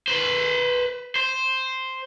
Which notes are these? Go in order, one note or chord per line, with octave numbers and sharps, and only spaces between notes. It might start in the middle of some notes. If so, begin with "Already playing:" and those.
B4 C5
C5